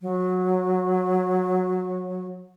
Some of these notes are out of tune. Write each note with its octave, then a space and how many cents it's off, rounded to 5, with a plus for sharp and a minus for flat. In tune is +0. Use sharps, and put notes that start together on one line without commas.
F#3 -15